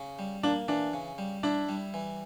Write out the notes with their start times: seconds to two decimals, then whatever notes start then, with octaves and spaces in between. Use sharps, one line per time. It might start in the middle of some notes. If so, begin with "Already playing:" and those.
Already playing: C#3
0.19 G3
0.43 A#3 D4
0.68 E3 D4
0.94 C#3
1.18 G3
1.43 D4 E4
1.69 G3
1.94 E3